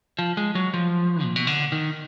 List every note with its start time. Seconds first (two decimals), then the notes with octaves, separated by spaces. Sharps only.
0.19 F3
0.37 G#3
0.55 F#3
0.74 F3
1.24 A#2
1.36 B2
1.47 D3
1.72 D#3